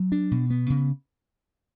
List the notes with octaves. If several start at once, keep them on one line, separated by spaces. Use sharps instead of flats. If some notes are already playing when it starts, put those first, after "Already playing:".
Already playing: F#3
D4
B2
B3
C#3